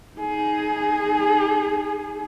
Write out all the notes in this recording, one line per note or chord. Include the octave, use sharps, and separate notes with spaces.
D#4 G#4